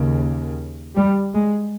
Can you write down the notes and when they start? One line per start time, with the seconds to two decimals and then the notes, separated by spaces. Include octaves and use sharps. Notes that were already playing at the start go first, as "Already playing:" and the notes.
Already playing: D#2 C#3
0.95 G3
1.33 G#3